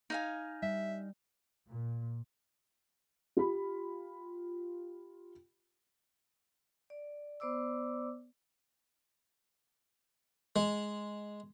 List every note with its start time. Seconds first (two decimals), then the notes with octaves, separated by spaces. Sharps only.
0.10 D#4 F5 G#5
0.63 G3 E5
1.68 A#2
3.37 F4 G4 B5
6.90 D5
7.40 B3 C5 D5 D6 E6
10.56 G#3